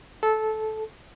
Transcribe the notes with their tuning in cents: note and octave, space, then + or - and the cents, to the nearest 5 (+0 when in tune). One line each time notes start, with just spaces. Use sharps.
A4 -15